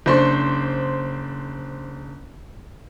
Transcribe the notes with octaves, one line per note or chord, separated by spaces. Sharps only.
F#1 D4 C5 C6 C#6